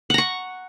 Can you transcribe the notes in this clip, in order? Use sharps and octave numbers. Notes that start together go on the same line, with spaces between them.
F#5 A#5 C#6